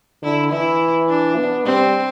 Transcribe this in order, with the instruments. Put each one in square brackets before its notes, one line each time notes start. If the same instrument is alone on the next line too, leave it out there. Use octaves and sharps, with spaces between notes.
[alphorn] D3 [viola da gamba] E4
[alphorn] E3 [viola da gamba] E4
[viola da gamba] D4
[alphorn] B3
[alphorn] G3 [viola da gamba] C4